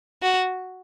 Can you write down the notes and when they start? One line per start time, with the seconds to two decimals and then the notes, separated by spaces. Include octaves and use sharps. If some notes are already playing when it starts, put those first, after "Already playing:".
0.22 F#4